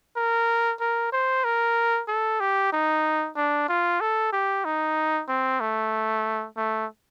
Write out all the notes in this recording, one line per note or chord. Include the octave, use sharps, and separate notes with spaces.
A#4
A#4
C5
A#4
A4
G4
D#4
D4
F4
A4
G4
D#4
C4
A3
A3